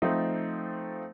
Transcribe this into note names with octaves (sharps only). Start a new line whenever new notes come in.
F3 A3 C4 D#4